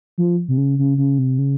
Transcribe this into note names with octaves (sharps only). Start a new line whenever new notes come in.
F3
C3
C#3
C#3
C#3
C3
C#3